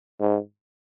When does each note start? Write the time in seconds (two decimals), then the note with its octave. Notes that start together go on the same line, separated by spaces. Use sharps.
0.21 G#2